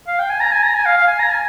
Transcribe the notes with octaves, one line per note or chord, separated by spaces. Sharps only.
F5
G5
G#5
A#5
G#5
A#5
G#5
F5
F5
G#5
A#5
G#5